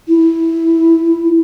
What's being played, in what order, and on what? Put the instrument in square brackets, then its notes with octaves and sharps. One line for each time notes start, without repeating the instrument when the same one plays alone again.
[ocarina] E4